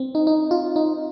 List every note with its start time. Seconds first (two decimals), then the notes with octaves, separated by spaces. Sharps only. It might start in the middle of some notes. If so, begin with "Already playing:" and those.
Already playing: C4
0.15 D#4
0.27 D#4
0.51 F4
0.76 D#4